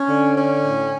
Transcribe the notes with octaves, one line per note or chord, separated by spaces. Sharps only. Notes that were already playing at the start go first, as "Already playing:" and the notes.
Already playing: C#4
D3
C#4
A2